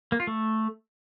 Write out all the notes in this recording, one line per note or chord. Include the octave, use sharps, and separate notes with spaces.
A#3
F4
A3